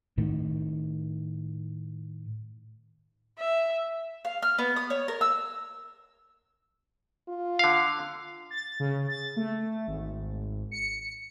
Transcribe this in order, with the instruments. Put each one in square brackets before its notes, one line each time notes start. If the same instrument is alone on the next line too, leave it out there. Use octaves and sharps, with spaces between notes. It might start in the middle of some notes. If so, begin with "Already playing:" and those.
[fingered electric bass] A2 D#3
[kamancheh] E5
[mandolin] F5
F6
B3
D#6
C#5
A#4
E6
[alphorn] F4
[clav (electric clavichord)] D3 F5
[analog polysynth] A6
C#3
A6
A3
G#1
C#7